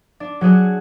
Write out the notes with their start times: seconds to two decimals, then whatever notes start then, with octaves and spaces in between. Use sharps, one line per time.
0.20 D4
0.41 F#3 F#4 G#4